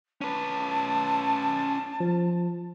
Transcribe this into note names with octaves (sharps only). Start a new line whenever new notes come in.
C#4 B4 A5
F3